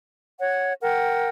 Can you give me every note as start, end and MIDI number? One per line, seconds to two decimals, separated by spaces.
0.39 0.72 73
0.39 0.72 78
0.81 1.29 70
0.81 1.29 78
0.81 1.29 79